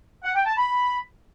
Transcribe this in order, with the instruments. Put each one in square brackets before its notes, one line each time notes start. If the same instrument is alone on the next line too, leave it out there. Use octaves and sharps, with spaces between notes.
[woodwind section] F#5
G5
A5
B5